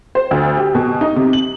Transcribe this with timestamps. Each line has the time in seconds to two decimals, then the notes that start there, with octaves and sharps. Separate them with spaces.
0.15 C5
0.31 D2
0.57 G4
0.75 B2
1.01 D#4
1.16 C3
1.33 F#7